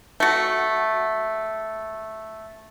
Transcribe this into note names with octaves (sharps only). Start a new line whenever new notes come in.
A3 F#4